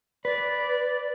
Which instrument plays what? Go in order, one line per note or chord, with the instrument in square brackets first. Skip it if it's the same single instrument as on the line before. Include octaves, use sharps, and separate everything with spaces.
[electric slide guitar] B4 [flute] D5